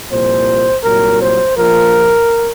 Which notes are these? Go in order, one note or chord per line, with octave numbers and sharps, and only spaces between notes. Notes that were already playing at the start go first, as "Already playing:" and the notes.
C2 A#2 F3 C5
C2 A#2 F#3 A#4
C5
A#1 A#2 F3 A#4